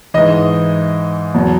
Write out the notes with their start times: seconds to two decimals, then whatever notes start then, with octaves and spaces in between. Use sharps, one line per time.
0.14 G#2 E3 D#5
1.34 E2 B2 F#3